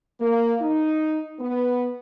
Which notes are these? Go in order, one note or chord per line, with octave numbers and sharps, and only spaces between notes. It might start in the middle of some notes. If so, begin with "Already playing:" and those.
A#3
D#4
B3